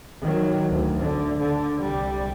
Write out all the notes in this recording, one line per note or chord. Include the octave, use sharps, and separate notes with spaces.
D#3 F#3
D2
D3
D3
C2 G3